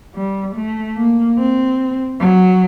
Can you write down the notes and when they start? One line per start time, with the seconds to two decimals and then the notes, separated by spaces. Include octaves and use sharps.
0.15 G3
0.56 A3
0.97 A#3
1.38 C4
2.19 F#3